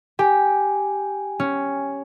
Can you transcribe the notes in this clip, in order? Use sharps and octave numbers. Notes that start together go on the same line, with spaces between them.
G4 G5 G#5
C#4